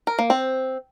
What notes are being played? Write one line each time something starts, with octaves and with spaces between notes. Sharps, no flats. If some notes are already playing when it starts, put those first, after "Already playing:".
A#4
A#3
C4